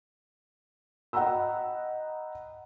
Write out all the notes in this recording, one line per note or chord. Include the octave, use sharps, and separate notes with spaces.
D#5 F#5 G5 A#5 B5 E6